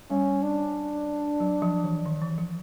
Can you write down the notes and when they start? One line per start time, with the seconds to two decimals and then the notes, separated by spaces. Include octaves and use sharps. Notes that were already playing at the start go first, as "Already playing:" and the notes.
0.10 G3 C#4
0.43 D4
1.40 F#3
1.62 F3
1.84 E3
2.06 D#3
2.22 E3
2.38 F3